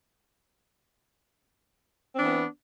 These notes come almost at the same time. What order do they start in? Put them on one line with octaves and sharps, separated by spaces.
C4 D4 E3 B3